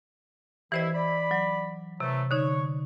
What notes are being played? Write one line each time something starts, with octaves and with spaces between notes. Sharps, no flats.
G2 D#3 E3 E4 C5 D#5
D5 B5
F#3
C3 E3 F#3 A3
D3 D#4 C#5